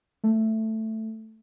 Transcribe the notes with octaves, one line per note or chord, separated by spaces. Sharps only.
A3